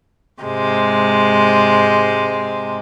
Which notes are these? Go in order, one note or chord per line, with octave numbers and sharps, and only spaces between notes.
G#2 C3 G#3